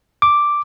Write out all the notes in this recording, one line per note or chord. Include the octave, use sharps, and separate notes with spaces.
D6